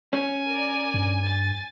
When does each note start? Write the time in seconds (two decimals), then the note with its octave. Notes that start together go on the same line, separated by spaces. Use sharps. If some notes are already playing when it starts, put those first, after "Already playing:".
0.13 C#4 G#5
0.48 A#4 D5
0.94 G2
1.27 A6